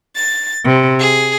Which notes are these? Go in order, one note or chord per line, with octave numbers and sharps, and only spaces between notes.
A6
C3
G#4